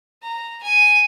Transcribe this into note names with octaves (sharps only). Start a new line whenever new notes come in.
A#5
G#5